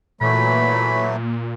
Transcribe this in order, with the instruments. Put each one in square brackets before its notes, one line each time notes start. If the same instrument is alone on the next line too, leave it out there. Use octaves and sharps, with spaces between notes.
[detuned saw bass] A#2 [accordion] E3 F#3 A3 [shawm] B5